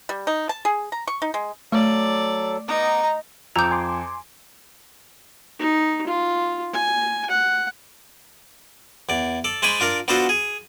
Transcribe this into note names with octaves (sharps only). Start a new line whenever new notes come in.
G3
D#4
A5
G#4
A#5
C#6
D#4
G#3
F#3 A3 A4 D5
B3 D#4 F#5 A#5 D6
F2 A#5 D6 E6 G6
G#5 C6 D6
D#4
F4
G#5
F#5
E2 D5
A4 D5
G#3 C5 D5 G#5 B5 C#6
D4 F4 A#4 D5
B3 D4 F4 F#4 A4 C5
G#4